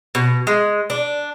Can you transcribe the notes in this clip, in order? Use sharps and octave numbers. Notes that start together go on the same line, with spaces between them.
B2
G#3
D4